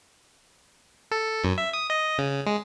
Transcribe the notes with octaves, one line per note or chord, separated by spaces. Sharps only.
A4
F#2
E5
D#6
D#5
C#3
G#3